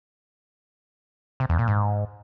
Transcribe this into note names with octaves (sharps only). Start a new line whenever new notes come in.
C3
E2
A#2
G#2